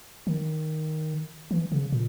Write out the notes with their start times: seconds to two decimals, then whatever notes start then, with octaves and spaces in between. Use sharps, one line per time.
0.27 D#3
1.51 E3
1.72 C#3
1.92 A#2